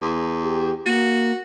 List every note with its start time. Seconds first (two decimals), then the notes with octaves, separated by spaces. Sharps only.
0.02 E2
0.42 G4
0.86 A#3 F#4